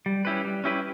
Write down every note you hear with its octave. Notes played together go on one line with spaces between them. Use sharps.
G3
C#4 E4 G4 B4
G3
C#4 E4 G4 B4